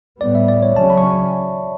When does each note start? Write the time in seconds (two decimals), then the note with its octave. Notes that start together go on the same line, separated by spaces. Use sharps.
0.21 A2 G3 B3 D5
0.35 E5
0.48 D5
0.62 C#5
0.76 C#3 F#3 C#4 A5
0.90 B5
0.98 C#6